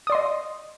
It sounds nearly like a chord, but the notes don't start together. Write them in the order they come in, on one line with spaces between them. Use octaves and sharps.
D#6 D5 C6 D#5